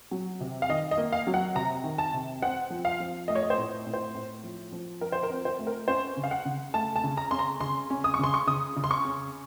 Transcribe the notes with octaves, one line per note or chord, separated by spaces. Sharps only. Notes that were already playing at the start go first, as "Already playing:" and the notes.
F#3
C3
F5
D#3 D#5
D#5
A#3
F5
F#3
F#5
C3 A#5
D#3
A5
C3
C4 F#5
F3
F5
F3
A3 D#5
C#5
D#5
C5
A2
A2
C5
A2
F3
F3
F3 A#4
C5
A#4
C4
C5
A3
A#4
C#4 C5
C#3
F5
F#5
C#3
A3 A5
A5
C#3
A#5
C#4 C6
A#5
C#3 C6
C#4
D#6
C#6
C#3 C6
C#6
C#3 D#6
C#3
C6
C#6
C#4